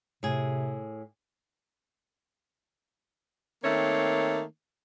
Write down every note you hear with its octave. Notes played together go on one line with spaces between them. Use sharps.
A2 C3 G#4
D#3 A3 A#3 C4 C#5